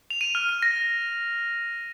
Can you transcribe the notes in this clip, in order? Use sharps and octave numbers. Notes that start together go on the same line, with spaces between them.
F7
D#7
F6
D#7
A#6